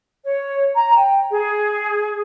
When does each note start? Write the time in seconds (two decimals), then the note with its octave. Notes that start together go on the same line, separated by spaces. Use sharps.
0.24 C#5
0.75 A#5
0.96 G5
1.30 G#4